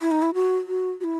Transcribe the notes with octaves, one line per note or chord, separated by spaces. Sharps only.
E4
D#4
E4
F#4
F#4
F#4
E4